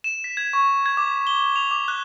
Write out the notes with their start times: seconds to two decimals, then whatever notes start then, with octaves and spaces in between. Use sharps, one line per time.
0.04 E7
0.24 B6
0.37 G#6
0.53 C#6
0.86 G#6
0.97 D6
1.27 G7
1.56 F7
1.71 D6
1.88 F#6